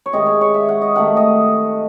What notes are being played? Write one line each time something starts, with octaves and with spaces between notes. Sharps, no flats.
C#5
C3 D#3 G#3 D#5
C#5
C#5
E5
F#5
D#5
C3 D#3 A3 F#5
D#5